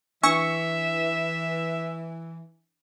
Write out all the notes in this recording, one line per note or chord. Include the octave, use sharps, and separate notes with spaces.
E3 D4 E5 C#6 E6